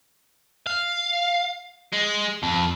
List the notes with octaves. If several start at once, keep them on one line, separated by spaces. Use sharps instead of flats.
F5
G#3
F2